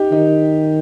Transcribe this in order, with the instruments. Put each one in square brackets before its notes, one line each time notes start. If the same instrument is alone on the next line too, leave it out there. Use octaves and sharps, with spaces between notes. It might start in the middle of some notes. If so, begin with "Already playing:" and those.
Already playing: [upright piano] D#4 G4
[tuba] D#3 [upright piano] D#4